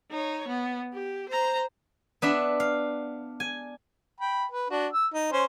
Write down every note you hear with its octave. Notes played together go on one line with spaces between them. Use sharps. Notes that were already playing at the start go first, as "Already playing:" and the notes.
D#4 C#5
B3
G4
C5 A#5
B3 D4 E5
F5
G#5
G5 B5
B4
D4 F#4
E6
D#4
C#4 C5